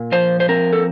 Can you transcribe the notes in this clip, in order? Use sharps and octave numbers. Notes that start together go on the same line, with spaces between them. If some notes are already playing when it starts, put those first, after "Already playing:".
Already playing: A#2
F3 C5
C5
C4 A#4
A4